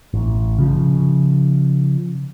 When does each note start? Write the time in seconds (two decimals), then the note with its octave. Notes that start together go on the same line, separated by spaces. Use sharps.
0.14 A1
0.59 C#3 F3